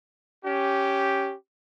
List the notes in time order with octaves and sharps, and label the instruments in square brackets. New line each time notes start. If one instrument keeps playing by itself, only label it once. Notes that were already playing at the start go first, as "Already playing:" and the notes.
[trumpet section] C#4 G4